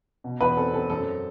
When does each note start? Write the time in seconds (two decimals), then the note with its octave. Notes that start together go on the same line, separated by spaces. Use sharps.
0.24 B2
0.40 E2 B4
0.57 C4 A4
0.73 C4 A4
0.89 F#2 A4